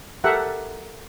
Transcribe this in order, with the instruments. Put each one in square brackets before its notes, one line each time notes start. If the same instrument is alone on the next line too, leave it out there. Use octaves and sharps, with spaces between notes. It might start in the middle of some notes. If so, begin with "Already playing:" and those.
[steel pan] G4 A4 A#4 E5 F#5